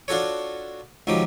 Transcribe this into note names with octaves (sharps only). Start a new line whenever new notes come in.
D4 F4 F#4 A4 C#5
C#2 D#3 F3 F#3 G4